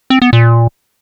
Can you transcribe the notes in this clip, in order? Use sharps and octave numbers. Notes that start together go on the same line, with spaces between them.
C4
B3
A#2